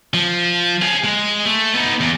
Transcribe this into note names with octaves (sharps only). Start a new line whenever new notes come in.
F3
G#4 F5
G#3
A3
B3 D#4
E2